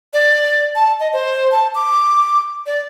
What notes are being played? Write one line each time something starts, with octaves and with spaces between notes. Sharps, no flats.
D5
A5
D#5
C5
A5
D6
D5